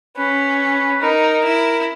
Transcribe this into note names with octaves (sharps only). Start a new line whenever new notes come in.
C#4 B4
D#4 A#4
E4